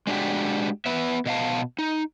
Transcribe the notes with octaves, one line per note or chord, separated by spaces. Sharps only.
G#3 D4 F#4 G4
B3 B4 E5
B2 D#5 F5 A5
D#4